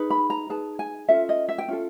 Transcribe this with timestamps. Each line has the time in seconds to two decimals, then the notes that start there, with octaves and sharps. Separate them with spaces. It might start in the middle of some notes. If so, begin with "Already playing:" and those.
Already playing: D#4 G#4 B4
0.10 B5
0.30 A#5
0.49 D#4 G#4 B4 A5
0.79 G#5
1.08 C#4 F4 A4 E5
1.29 D#5
1.49 E5
1.58 G5
1.68 C#4 F4 A4